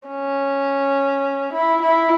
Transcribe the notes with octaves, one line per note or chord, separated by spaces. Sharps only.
C#4
E4
E4